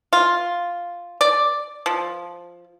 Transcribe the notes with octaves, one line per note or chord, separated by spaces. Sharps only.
F4
D5
F3